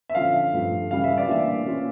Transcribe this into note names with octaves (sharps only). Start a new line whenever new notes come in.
E5
D3 F3 C#4 F5
G2 F3 A3
C#3 E3 G3 F5
E5
D5
E3 G3 A#3 D4 F4 E5
E3 A#3 C#4 F4